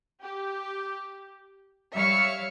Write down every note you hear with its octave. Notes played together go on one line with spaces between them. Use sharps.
G4
G3 C#5 E5 F5 F6 C#7